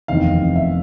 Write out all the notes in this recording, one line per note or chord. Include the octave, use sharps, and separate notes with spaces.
F1 E2 C3 D#3 F5
E5